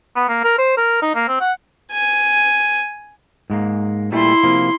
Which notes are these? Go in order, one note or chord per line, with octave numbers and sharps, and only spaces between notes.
B3
A#3
A#4
C5
A#4
D#4
A#3
C4
F#5
G#5
G#2 G#3 A#3
A#2 G3 A3 E4 C6
C3 F3 A#3